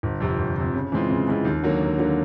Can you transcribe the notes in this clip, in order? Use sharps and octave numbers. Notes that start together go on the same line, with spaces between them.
G1
F2 C3
G1
F2 C3
C#3
E3 G#3 C4 F4
C#3
E3 G#3 C4 F4
D#2
D3 F#3 A#3
D#2
D3 F#3 A#3